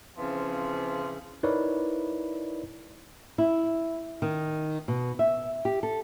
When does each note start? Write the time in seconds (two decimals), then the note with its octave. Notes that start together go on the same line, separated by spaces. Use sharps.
0.17 C#3 E3 F3 C4
1.43 D#4 E4 A#4 B4 C#5 D5
3.38 E4
4.22 D#3
4.88 B2
5.19 E5
5.65 G4
5.83 A4